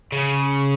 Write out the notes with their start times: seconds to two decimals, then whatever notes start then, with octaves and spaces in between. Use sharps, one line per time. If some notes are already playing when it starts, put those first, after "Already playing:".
0.12 C#3